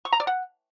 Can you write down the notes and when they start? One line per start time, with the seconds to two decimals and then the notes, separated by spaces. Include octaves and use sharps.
0.05 C#6
0.12 A#5
0.20 D5
0.27 F#5